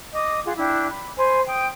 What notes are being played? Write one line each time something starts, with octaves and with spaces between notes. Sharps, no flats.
D#5 D6 D#6
F4 G#4 F#5
D4 E4 G5
B5
C5 G#5 B5
G5 D#6